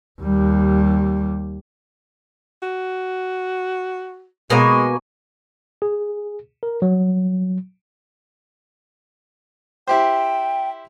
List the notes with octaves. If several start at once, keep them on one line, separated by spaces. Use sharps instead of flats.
D#2 G3
F#4
B2 G#3 A#3 G#5
G#4
A#4
F#3
E4 G4 C5 G5